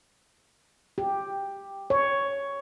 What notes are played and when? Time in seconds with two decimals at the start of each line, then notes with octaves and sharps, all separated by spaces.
0.98 G4
1.90 C#5